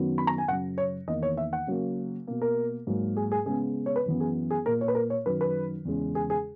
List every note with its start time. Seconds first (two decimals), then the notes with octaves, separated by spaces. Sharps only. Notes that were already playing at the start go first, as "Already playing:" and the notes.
Already playing: F#2 D#3 F#3 B3
0.18 B5
0.27 A#5
0.38 G#5
0.48 F#2 C#3 F#3 F#5
0.78 C#5
1.08 E2 D#3 A#3 D#5
1.23 C#5
1.37 E5
1.53 F#5
1.67 C#3 F#3 A#3
2.27 B2 A#3
2.42 A#4
2.87 G#2 F#3 A#3
3.17 G#4
3.32 G#4
3.46 C#3 G#3 B3 G#4
3.86 C#5
3.96 B4
4.05 F#2 E3 B3
4.20 G#4
4.51 G#4
4.65 A#2 A#3 A#4
4.81 C#5
4.88 B4
4.95 A#4
5.10 C#5
5.26 F#2 D#3 F#3 B4
5.41 B4
5.85 E2 C#3 G#3
6.15 G#4
6.30 G#4